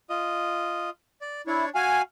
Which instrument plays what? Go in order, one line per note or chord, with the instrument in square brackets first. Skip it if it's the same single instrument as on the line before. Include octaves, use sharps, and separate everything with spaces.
[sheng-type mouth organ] F4 D#5
D5
[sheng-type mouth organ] D4 C#5 [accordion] E4
[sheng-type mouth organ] F#4 F5 [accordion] G#5